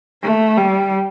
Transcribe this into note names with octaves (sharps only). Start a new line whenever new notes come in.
A3
G3